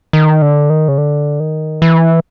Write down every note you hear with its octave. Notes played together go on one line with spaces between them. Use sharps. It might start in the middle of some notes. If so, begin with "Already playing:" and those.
D#3
D3
D#3
C#3
D3
D#3
E3